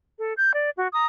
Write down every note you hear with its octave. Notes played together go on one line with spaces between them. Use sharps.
A4
G6
D5
F#4
A#5 D#6